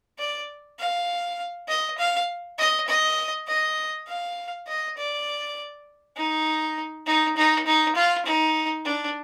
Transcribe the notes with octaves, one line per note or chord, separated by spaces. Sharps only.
D5
F5
D#5
F5
D#5
D#5
D#5
F5
D#5
D5
D#4
D#4
D#4
D#4
F4
D#4
D4